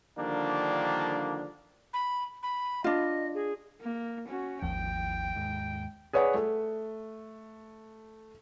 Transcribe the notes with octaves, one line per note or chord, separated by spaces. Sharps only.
D3 D#3 F3 G3 A#3 D4
B5
B5
D4 F4 D#5
G#4
A#3
C#4 F#4
G#1 D#2 F3 G5
D#2 G#2
G#4 B4 C#5 D5 F#5
A3